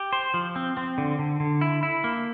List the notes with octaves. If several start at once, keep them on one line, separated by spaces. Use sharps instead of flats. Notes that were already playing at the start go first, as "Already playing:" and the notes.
Already playing: G4
C5
F3
C4
C4
D3
D3
D3
E4
E4
A#3